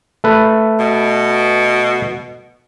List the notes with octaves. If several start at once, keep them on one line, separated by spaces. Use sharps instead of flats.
A3 B4
B2